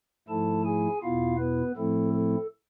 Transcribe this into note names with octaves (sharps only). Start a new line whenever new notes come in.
G#2 F3 A3 E4 A4 A5
G#4 G#5
E2 B2 B3 E4 F4 F5
B3 B4
A2 F3 A3 C4 E4 A4
A4